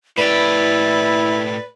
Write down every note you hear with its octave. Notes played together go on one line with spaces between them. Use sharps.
A2 E4 G4 B4 D5